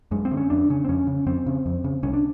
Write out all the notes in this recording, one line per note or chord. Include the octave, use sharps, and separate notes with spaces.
F#2 G#3
C4
D3
C#4
F2 D4
C#3 C#4
C4
F2 C#4
C#3
F2 C4
C#3
F2
C#3
C2 C#4
D4